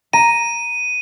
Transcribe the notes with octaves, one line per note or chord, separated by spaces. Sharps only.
A#5 D#7